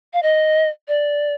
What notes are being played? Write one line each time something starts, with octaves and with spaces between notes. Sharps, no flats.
F5
D#5
D5